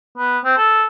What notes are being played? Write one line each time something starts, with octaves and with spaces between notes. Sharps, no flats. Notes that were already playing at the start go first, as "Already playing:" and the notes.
B3
C4
A4